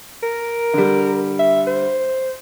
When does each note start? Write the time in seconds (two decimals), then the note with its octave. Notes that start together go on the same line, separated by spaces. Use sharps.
0.23 A#4
0.74 D3 G3
1.39 E5
1.67 C5